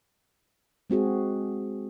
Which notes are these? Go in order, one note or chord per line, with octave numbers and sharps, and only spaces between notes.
G#3 C4 F#4 G#4